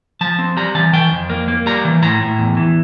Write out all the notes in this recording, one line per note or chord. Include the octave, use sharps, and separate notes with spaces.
F3 A5
C4
G3 A#5
E3 A5
E3 G5
F2
A#3
A#3
G3 A#5
E3
A2 A#5
A2
E2
E3